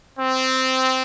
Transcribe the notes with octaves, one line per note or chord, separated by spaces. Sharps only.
C4